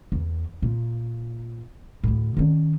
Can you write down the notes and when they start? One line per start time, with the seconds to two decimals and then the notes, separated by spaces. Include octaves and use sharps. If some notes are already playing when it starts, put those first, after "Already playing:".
0.12 E2
0.62 A#2
2.04 D2 A2
2.37 D#3 C#4